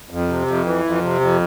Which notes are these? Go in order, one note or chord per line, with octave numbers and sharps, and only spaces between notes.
F2
C3
F2
E3
F2
C3
F2